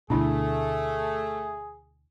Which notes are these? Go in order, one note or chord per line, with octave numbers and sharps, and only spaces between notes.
D2 B2 A3 D4 E4 G#4